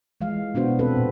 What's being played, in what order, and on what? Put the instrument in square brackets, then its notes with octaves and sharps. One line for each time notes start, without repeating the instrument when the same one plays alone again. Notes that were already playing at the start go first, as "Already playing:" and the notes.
[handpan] E3 G#3 F5
B2 B3 D4 F#4 C5
C4 A4 B4
A#2